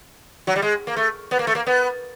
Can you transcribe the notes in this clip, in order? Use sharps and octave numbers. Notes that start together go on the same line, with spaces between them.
F#3
G3
G#3
A#3
A3
B3
A#3
A3
A#3
B3